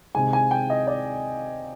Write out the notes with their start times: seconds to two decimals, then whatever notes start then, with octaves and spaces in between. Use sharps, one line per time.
0.15 C3 D#3 G#3 G#5
0.33 G#5
0.51 G5
0.70 D#5
0.87 D5